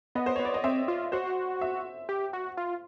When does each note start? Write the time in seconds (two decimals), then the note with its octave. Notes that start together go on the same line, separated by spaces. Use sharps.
0.15 B3 D#5
0.26 C5
0.36 B3 C#5
0.45 D5
0.54 D#5
0.64 C4 E5
0.88 F4
1.12 F#4 C5
1.61 E5
2.09 G4
2.33 F#4
2.57 F4